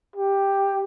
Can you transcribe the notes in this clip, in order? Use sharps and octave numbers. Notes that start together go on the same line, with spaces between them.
G4